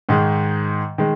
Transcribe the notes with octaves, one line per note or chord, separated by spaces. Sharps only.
G#2 D#3 G#3
D#3 G#3